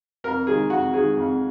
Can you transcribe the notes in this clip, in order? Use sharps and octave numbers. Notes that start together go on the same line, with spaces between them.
F2 A#4
D#3 G#3 G#4
F2 F#4
D#3 G#3 G#4
F2